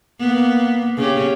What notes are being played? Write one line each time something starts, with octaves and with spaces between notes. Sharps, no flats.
A#3 B3
C#3 C#4 G4